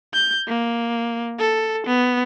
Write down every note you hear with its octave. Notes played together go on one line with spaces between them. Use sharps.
G6
A#3
A4
B3